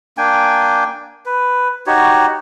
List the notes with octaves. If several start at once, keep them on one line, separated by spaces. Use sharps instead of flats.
A#3 D4 G5 G#5
B4
D#4 F#4 G4 C#5